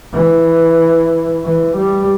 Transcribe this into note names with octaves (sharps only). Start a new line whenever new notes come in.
E3
E3
G3